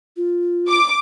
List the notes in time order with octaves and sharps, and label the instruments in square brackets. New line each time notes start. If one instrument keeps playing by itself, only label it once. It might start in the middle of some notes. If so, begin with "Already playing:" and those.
[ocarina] F4
[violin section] D6